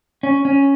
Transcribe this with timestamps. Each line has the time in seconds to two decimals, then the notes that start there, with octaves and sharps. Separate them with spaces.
0.23 C#4
0.45 C#4